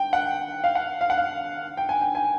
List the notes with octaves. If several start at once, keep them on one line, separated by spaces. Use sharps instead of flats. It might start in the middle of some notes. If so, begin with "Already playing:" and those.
Already playing: G5
F#5
F5
F#5
F5
F#5
F5
G5
G#5
G5
G#5